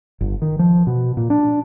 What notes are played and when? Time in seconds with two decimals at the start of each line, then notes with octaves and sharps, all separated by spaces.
0.21 G1
0.42 D#3
0.59 F3
0.87 B2
1.17 A#2
1.30 D4